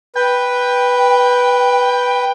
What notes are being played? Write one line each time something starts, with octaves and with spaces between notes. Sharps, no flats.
B4 G5